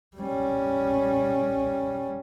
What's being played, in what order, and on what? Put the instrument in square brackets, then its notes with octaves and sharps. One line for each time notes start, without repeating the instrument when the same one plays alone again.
[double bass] G3 C#4